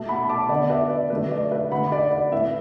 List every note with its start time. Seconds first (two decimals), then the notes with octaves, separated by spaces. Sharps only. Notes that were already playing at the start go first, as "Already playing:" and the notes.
Already playing: B2 A3 E5 A5
0.09 F#5 B5
0.29 A5 D6
0.49 D3 B3 D5 F#5
0.70 B4 E5
0.90 D5
1.10 D3 F#3 A3 B4
1.32 D5
1.51 B4 E5
1.71 D3 A3 F#5 B5
1.92 D5 F#5
2.12 D5 F#5
2.32 A2 A3 B4 E5